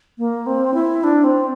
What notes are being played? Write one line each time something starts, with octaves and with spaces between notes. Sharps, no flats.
A#3
C4
E4
D4
C4